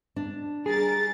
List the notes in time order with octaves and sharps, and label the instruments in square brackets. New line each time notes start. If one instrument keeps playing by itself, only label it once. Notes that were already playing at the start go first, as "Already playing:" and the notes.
[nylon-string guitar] D4
[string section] G3 A#4 A6 [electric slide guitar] G#4